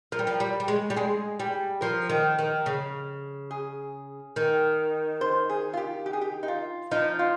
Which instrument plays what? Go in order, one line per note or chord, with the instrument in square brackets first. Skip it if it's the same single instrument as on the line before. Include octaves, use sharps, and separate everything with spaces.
[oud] F3 [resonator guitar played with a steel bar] A#4
[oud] G3
F3
G3
G3
G#3
G3
[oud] G#3 [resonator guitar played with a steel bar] G#4
[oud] G3
[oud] F3 [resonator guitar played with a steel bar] A#4
[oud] D#3
D#3
C#3
[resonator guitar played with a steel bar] G#4
[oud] D#3
[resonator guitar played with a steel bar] C5
G#4
F4
G4
G4
G#4
G4
D#4
F4
[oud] F3 [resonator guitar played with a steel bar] D#4
[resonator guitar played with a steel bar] F4